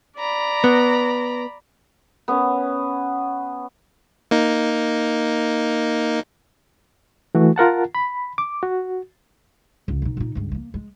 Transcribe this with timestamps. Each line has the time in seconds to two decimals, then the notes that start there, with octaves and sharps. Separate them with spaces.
0.19 D5 A#5 B5
0.64 B3
2.28 B3 C#4
4.31 A#3 D#4
7.35 E3 A3 F#4
7.56 F4 A#4 F#5 A5
7.95 B5
8.38 D6
8.63 F#4
9.88 C#2
10.02 B2 D#4
10.17 A#2 D#4
10.35 C#2 G2
10.51 G3 A#3
10.74 G#3